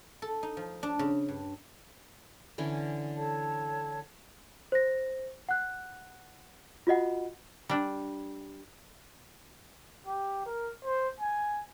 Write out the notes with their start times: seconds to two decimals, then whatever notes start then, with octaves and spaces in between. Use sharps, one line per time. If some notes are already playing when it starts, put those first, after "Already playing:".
0.22 A4
0.43 D#4
0.57 F3
0.83 D4
0.99 C#3
1.29 G2
2.58 D3 E3 C#4
3.15 A4 C#5 A5
4.72 C5 A#6
5.49 F#5 F#6
6.87 F4 F#4 D#5 F#5
7.69 G3 D4
10.06 G4
10.46 A#4
10.85 C5
11.20 G#5